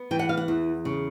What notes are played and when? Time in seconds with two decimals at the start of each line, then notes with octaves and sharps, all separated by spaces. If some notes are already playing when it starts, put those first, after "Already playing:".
Already playing: B3
0.11 E3 G5
0.19 F#5
0.29 F5
0.37 F#5
0.48 E2
0.85 C#3